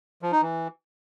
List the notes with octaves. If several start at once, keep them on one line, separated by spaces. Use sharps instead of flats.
F3
D#4
E3